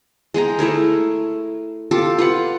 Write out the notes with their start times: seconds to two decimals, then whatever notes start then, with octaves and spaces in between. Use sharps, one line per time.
0.34 G#3 G#4 G5 A#5
0.59 A3 E4 G#4 A#4
1.91 F4 G4 A4 D6
2.18 F4 B4 F#5